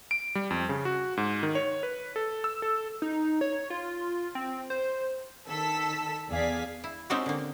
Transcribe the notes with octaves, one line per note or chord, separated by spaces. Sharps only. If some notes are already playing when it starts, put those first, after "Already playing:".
D7
G3
F2
C#3
F#4
G#2
D#3
C#5
B4
A4
E6
A4
D#4
C#5
F4
C4
C5
D#3 A4 E6 B6
E2 G#4 D5 F5 B6
E4
G#3 C4 C#4 D#4 F#4 G4
D3 A#3